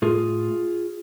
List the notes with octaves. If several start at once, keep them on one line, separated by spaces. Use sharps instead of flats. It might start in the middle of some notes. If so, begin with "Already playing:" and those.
A2 F4 G#4